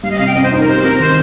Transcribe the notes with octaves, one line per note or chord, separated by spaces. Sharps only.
G3 F5
D#5
C3 F5
G5
F2 D#5
C5
D#4
A#4
G4 C5
C4 A#4
D#3 C5